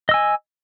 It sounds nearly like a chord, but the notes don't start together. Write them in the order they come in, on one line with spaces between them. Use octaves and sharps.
D#5 E6 G#5